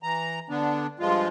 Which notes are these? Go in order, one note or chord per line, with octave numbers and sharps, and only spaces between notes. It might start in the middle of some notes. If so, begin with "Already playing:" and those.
E3 A#5
D3 B3 D4
G2 F3 G#3 F4